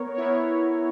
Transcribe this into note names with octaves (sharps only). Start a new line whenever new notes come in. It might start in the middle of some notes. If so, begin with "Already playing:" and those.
Already playing: B3 A#4 C#5
B3 E4 A#4 C#5